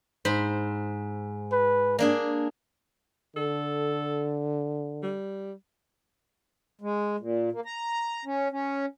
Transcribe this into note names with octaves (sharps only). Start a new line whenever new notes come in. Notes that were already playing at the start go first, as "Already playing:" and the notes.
G#2 C5 B5
B4
A#3 D4 G#4 D5
D3 A4
G3
G#3
A#2
A#3
A#5
C#4
C#4